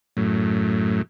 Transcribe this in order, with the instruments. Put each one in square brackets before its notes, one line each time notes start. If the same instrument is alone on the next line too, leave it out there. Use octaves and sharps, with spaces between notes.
[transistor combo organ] F#2 A2